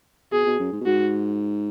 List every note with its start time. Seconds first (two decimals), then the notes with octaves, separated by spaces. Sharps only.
0.32 B2 G#4
0.46 B2
0.59 F#2
0.72 G#2
0.81 B2
0.86 G#2 F#4